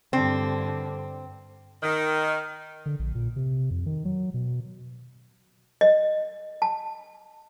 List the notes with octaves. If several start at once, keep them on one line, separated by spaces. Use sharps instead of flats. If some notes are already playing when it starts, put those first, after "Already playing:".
G2 D3 C4
D#3
D3
A#1
A#2
C3
F2
D#3
F#3
B2
D#5
A5